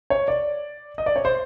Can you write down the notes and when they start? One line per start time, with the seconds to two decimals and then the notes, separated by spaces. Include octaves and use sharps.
0.10 C#5
0.28 D5
0.98 D#5
1.06 D5
1.16 C#5
1.25 C5